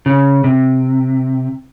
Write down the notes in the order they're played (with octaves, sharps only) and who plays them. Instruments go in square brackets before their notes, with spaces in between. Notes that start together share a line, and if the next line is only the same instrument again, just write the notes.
[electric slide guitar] C#3
C3